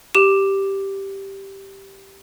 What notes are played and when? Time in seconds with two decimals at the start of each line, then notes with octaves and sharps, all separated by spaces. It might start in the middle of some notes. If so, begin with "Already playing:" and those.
0.15 G4 E7